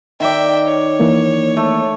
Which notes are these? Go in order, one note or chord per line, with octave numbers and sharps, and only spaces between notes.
D#3 D5 E5 G5
C#5
E3 A#3
A3